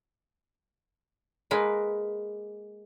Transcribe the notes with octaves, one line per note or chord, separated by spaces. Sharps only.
G#3 A#3 B4